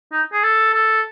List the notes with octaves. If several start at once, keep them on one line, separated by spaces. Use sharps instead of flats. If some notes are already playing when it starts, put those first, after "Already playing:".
D#4
G#4
A4
A4